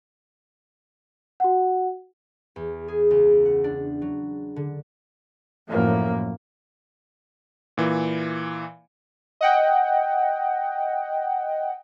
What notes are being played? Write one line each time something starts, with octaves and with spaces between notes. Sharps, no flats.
F#4 F#5
E2
G#4
C#2
F#5
D4
F#3
D3
F#2 A2 F3 A#3
A#2 E3
D#5 F#5 G5